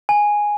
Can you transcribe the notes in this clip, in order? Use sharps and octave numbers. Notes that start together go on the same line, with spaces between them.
G#5